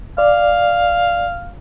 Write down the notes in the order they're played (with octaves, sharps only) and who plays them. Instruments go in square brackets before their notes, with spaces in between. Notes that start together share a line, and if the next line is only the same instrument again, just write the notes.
[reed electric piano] D5 [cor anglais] F5